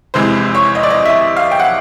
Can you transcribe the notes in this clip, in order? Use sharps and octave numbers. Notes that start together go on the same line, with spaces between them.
F1 E2 C3 E3 G#3 C5
C#5
D#5
D5
D#5
E5
F5
G5
F#5